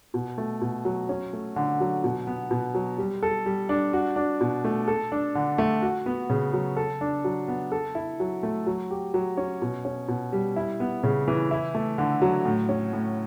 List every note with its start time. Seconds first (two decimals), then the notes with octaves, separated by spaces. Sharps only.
0.14 B2
0.38 A3
0.61 B2
0.85 F#3
1.09 C#4
1.33 A3
1.56 D3
1.80 F#3
2.04 B2
2.27 B3
2.51 B2
2.74 F#3
2.98 G3
3.23 A4
3.46 G3
3.69 D4
3.93 F#4
4.16 D4
4.41 B2
4.64 A3
4.88 A4
5.12 D4
5.35 D3
5.58 A3
5.82 F#4
6.06 B3
6.30 C#3
6.53 F#3
6.77 A4
7.01 D4
7.24 F#3
7.48 B3
7.72 A4
7.95 E4
8.20 F#3
8.43 A3
8.66 F#3
8.91 G4
9.14 F#3
9.37 C#4
9.62 B2
9.85 C#4
10.08 B2
10.33 G3
10.56 E4
10.80 B3
11.03 C#3
11.28 E3
11.51 E4
11.75 A3
11.98 D3
12.22 F#3
12.45 A2
12.69 C#4
12.93 A2